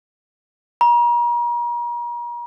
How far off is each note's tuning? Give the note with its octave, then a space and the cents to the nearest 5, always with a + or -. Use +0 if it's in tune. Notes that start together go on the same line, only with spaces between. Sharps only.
A#5 +40